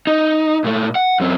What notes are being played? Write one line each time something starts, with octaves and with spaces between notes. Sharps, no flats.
D#4
A#2 A3
F#5
F#2 C4